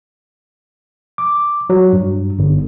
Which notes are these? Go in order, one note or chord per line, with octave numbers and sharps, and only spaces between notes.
D6
F#3
G2
G1